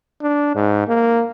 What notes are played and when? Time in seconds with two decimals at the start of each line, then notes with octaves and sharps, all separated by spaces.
0.22 D4
0.55 G#2
0.88 A#3